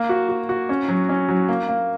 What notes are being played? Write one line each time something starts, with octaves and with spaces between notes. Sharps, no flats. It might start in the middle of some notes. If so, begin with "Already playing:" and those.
Already playing: A#3
F#4
F#4
F#4
C#4
F#3
C#4
F#3
A#3
A#3